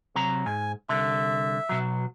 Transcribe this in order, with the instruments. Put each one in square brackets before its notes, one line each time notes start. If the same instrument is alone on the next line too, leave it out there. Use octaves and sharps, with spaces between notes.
[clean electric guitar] C3 F#3 A#5
[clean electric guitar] G#2 [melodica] G#5
[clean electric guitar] C2 D3 [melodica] E5
[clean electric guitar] B2 F#3